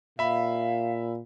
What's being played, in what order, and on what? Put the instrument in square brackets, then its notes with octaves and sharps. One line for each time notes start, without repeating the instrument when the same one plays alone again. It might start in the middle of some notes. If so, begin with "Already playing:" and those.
[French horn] A#2 [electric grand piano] E5 B5 [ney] F5